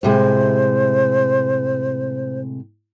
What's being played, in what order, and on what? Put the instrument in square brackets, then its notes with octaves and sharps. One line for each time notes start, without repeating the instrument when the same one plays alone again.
[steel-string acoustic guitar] A2 C3 G#3 [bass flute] C5